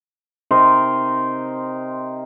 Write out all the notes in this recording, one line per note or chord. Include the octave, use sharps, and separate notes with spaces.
C3 D#4 A#4 C6